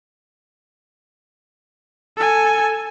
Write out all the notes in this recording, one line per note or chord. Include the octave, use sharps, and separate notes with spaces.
A4 G#5